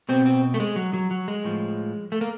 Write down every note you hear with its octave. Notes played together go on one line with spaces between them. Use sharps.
B2 C4
C4
A3
G#3
F#3
F#3
F#3
G#3
A2 F3
A3
A#3